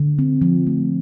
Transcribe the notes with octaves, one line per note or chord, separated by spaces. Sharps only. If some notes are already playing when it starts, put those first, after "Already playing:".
Already playing: D3
C4
F3
A3